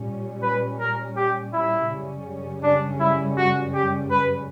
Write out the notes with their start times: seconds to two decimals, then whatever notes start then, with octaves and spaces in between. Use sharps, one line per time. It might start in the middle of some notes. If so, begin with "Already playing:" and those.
Already playing: A#2 G3 C#4
0.43 B4
0.79 A#4
1.17 G4
1.53 E4
1.90 F#2 C#3 G3 C#4
2.63 D4
3.00 E4
3.37 F#4
3.74 G4
4.11 B4